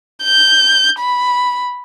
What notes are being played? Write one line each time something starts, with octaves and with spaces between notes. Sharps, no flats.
G6
B5